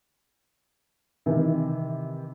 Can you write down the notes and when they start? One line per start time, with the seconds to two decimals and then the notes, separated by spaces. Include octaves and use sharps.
1.26 C3 D#3 E3